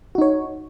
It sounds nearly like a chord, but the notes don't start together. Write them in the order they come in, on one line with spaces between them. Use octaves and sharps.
F#4 D#4 C#5